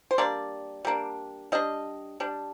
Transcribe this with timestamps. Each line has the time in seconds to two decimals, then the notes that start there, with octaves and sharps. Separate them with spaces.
0.11 C5
0.18 G3 A#3 D4 D5
0.85 G3 A#3 D4
1.52 G3 D4 D#5
2.20 G3 D4